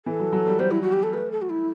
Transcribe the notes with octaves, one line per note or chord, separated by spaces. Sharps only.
E3 A4
F#3
F#3
G3
G3 C5
E4
F#4
G4
A4
A3 B4
A4
F#4
E4